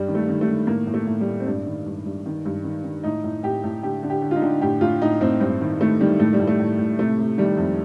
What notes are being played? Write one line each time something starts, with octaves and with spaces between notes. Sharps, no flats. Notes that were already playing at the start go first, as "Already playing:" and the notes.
Already playing: G2 G3
D#3
A3
D#3
A3
D#3
A2 A#3
A2
A3
A2
G3
A2
C4
G2 D4
D#3
G2
G2
D#3
G2
D#3
D#3
A2 D#4
A2
A2 G4
A2
D3 G4
D3
G4
D3
F4
D#4
D3
A2 G4
A2 F4
A2 D#4
A2 C4
G2 C4
D#3
D#3 A3
D#3 G3
A2 A3
G3
A2
A3
A2
A2
C3 A3
C3
D#3 G3
F2